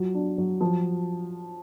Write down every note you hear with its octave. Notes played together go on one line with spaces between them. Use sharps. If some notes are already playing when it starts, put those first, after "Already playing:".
Already playing: F#3 F4
D4
F#3
F3